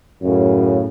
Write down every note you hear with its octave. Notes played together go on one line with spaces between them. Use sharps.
F#2 A2 C#3